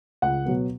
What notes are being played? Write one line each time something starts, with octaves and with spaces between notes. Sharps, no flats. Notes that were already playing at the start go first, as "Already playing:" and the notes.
C#2 F#5
B2 F#3 B3